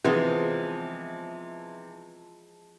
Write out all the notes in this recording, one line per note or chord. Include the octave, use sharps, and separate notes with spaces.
C3 E3 F3 G#3 B3